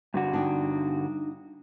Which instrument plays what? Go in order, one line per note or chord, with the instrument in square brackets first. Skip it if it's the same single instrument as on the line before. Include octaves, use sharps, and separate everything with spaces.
[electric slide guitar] G2 D3 F#4
[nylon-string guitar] D4 D#4 G5